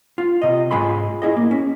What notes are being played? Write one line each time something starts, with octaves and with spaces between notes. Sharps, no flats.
F4
C3 D#5
G#2 G#3 F4 G#5 B5 C6
E4 G#4 D#5
A#3
C#4